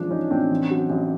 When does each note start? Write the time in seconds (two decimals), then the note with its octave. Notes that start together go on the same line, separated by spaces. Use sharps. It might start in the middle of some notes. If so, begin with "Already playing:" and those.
Already playing: A1 F3 G#3 D4
0.10 A1 C#4 D#4
0.31 A2 C4 D4
0.51 A1
0.70 F#3
0.90 A1